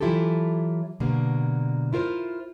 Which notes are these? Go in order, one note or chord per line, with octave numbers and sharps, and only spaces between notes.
E3 F#3 E4 F4 G4 A4
B2 D3 F#3 G3 A#3
E4 F4 A#4 C5